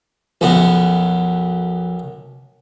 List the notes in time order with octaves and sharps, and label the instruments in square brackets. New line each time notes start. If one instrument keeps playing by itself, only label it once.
[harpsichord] B1 F#2 B3 [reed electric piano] F3